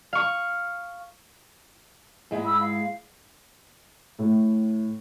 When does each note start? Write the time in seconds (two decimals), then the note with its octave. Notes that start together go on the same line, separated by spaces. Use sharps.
0.13 F5 C#6
2.31 G#2 G#3 E4
2.44 B5 E6
2.61 F5
4.19 A2